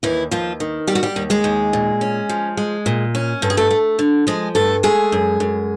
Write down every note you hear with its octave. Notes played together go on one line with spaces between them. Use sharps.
D#2 E3 E4
D#2 F3 F4
D#3
G3 G4
F#4
G3 G4
D#2
G#3 G#4
D#2
A#2
C#4
F3
G#3
A#2
C#4
G2 A4
G#4
A3 A4
A3
D3
F3 G#3 G#4
G2 A3 A4
G#3 A3 G#4
F#2
F#2